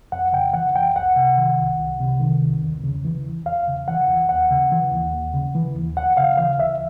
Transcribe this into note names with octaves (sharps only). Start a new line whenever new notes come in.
F2 F#5
C#3 G5
E3 F#5
F2 G5
C2 F#5
C3
D#3
C2
C2
C3
D#3
C2
E2
C#3
E3
E2
E2 F5
C#3
E3 F#5
E2
D#2 F#5
C#3
E3
D#2
D#2
C#3
E3
D#2
D2 F#5
C#3 F5
E3 F5
D2 E5